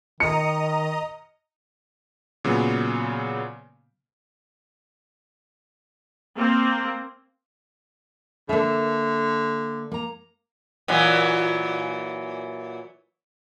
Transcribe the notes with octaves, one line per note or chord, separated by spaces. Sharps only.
D#3 D#5 A#5 D#6 C#7
A#2 C#3 F#3 B3
A#3 C4
D3 A#3 E5
A#3 A#5
A#2 E3 F#3